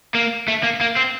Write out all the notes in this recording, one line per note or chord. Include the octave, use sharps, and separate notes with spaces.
A#3
A3
A#3
A#3
C4